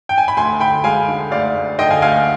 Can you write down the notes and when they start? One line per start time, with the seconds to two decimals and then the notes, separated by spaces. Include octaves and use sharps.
0.09 G5
0.18 G#5
0.28 B5
0.37 D2 G#5 C6
0.60 D3 G5 B5
0.84 G#3 F5 G#5
1.08 D3
1.31 D2 D5 F5
1.55 D2
1.79 D3 D#5 G5
1.90 F5 G#5
2.02 D2 F5 G#5